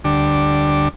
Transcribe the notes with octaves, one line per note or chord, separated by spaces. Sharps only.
D2 D3 G3 D4